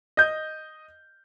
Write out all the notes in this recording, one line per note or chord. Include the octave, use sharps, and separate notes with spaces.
D#5 G6